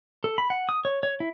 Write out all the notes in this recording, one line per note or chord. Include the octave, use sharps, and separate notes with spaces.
A4
B5
F#5
D#6
C#5
C#5
E4